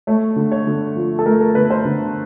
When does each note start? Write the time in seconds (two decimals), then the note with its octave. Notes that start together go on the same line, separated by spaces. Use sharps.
0.07 A3 C#5
0.36 D3
0.52 C#5
0.67 D3
0.96 F3
1.19 A4
1.26 A3 A#4
1.41 A#4
1.55 D3 B4
1.70 C5
1.85 D3